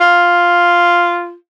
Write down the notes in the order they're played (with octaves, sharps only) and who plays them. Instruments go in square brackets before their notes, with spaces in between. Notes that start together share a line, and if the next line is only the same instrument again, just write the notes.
[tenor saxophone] F4